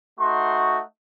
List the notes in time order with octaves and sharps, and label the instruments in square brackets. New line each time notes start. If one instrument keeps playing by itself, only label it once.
[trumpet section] A3 D#4 F#4 C6